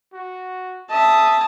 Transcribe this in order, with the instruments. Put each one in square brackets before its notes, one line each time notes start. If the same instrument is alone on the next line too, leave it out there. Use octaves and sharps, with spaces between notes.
[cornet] F#4
[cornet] E5 [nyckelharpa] A5 D#6